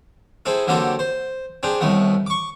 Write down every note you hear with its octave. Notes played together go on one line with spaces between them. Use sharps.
C4 E4 G#4 A4
D3 F#3 A#3 C4 G4 A4
C5
C4 D4 G4 G#4
C2 A2 D#3 A3 B3
C#6 D6